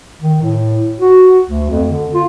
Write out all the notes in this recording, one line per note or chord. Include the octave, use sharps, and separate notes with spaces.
D#3
A2
F#4
D2
F2
D3
F4